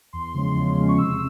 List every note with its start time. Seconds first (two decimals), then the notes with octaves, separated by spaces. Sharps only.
0.13 E2 C6
0.34 C#3 F3 G#3 C#4
0.56 E2
0.77 C#3 F3 G#3 C#4
0.88 C#6
0.98 C3 E6